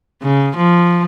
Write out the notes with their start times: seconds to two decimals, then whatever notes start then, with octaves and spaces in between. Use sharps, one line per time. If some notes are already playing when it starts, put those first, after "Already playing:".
0.23 C#3
0.57 F3